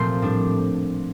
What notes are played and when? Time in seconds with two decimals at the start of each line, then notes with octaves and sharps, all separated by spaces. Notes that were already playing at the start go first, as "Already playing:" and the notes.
Already playing: A#2 F3 A3 C4 G4 C5 C6
0.22 A2 G3 D4